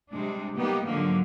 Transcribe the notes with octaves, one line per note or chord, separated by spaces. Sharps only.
C3 G3 G#3 D4
G3 A#3 B3 D#4 G4
G#2 D3 F3 F#3 A#3